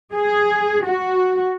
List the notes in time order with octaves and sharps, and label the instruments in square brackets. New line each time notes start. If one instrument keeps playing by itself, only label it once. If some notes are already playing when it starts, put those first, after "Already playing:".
[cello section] G#4
F#4